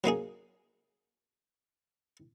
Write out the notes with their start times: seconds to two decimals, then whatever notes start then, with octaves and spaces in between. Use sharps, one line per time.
0.04 F#3 A#3 D#4 G#4